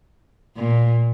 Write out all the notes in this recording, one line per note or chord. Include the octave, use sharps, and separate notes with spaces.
A#2